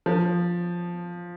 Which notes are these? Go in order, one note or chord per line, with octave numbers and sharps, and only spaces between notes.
F3